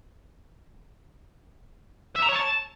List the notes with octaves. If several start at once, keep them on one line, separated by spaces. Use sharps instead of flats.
E5
A#5
C#5
A5